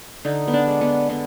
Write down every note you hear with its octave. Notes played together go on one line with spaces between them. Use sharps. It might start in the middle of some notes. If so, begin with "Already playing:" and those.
D3 D#4
B3
D4
G#3
B3
D3 B3